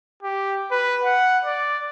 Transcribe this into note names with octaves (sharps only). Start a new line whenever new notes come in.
G4
B4
F#5
D5